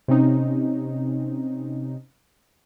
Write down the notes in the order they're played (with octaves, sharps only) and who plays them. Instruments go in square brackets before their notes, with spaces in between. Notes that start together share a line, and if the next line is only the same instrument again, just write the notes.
[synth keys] C3 C4 C#4 D#4